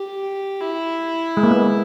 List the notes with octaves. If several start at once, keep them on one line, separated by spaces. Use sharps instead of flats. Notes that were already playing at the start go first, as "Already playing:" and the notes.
Already playing: G4
E4
G#3
A#3
B3